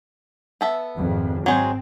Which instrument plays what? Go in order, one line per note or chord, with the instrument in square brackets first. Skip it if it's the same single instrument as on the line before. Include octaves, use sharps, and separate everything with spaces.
[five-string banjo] B3 A4 E5
[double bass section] G#1 F2
[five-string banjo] F#3 G#3 C5 [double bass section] C4